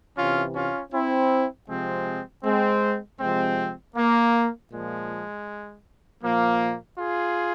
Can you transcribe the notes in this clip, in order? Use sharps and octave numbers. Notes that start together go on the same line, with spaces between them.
C3 E3 C#4 F4
C#4 F4
C4 E4
C3 F3 G#3 C4
G#3 C4
C3 F3 G#3 C4
A#3
A#2 F3 G#3
A#2 F3 A#3
F4 G#4